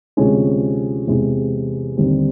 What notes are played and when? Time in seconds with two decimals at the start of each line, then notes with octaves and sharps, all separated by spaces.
0.17 D2 C3 F3 G#3 C#4
1.07 E2 C3 E3 G#3
1.97 D#2 D3 G3 C4